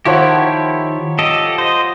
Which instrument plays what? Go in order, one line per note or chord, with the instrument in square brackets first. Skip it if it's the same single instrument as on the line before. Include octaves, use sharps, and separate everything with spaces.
[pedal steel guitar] D#3 E4 G4 [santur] F3 C#5 F#5
[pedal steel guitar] G4 A4 D#5
C5 D#5